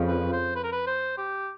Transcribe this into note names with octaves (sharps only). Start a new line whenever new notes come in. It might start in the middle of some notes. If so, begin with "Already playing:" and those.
Already playing: F2 C#3 F3
B4
C5
B4
A#4
B4
C5
G4